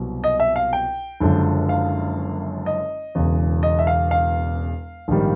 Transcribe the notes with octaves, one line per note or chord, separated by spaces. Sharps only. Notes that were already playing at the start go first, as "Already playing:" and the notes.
Already playing: C2 B2 F#3
D#5
E5
F5
G5
F#1 F#2 D3 F3 G#3
F5
D#5
E1 E2 C#3
D#5
E5
F5
F5
A#1 G#2 D#3 G3